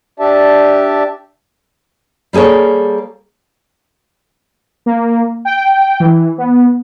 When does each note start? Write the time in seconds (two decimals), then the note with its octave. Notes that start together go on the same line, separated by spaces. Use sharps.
0.20 D4 G4 D5 E5 A5
2.33 G3 A#3 G#4 A4 C#5
4.86 A#3
5.45 G5
6.00 E3
6.38 B3